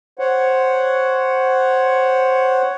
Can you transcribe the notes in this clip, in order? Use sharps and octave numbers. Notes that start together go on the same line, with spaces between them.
C5 C#5 F#5